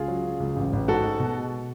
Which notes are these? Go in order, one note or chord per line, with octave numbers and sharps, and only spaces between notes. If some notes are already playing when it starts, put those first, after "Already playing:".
Already playing: C#2 F4 G#4
F#3
C#3
C#2
A1
A1
G#2 F#4 A4
G#3
B2